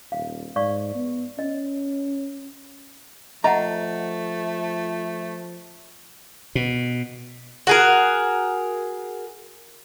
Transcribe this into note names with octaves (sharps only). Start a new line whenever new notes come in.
D#1 F5
G#2 D5 F5 C#6
B3
C#4 D#5
F3 A3 D#5 F#5 A#5
B2
F#4 G#4 A#4